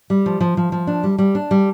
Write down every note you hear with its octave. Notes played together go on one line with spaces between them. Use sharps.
G3
F3
F3
F3
F3
D4
G3
G3
D4
G3